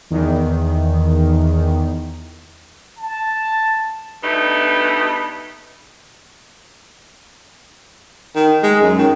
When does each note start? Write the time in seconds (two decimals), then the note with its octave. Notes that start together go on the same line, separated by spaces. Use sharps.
0.10 E2 D#3
2.98 A5
4.23 G2 B2 A3 B3 D#4
8.36 D#3
8.63 G#3
8.81 F#2
8.98 D#3